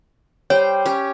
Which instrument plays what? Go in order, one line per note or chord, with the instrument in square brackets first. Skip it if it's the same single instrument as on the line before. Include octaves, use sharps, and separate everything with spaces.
[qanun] G3 C5 G5 [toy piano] C#5
[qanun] C#4 G4